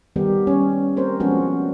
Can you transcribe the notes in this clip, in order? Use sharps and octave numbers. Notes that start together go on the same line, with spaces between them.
D#3 G3 B3 G4 A#4
G3 C#4 C#5
A#3 C4 A#4 C5 C#5
F3 G#3 B3 C#4 D4 F#4